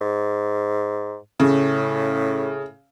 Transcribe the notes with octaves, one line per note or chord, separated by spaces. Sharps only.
G#2
A2 C#3